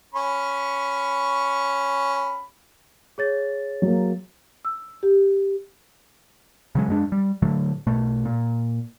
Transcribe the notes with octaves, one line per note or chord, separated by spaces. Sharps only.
C#4 B5 C#6
G#4 C#5 A6
F#3 A#3
E6
G4
C#3 F#3 G#3
F#2 G#3 D4
G3
A2 D3 F#3 A3
B1 B2 A3
A#2